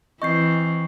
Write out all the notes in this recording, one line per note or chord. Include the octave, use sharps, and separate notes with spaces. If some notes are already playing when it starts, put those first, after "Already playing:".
E3 C4 D#5 C#6 G6 C7